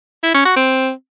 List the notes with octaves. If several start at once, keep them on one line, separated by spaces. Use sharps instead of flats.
E4
C#4
F#4
C4